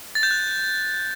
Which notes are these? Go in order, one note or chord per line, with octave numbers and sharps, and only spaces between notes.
A6
G6
F#6